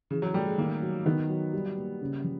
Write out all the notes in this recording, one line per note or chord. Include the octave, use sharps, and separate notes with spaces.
C#3 E3
F#3
G3 A3
G#3
D#3 A#3
F#3
D#3 B3
F#3
G3
A#3
C#3
F3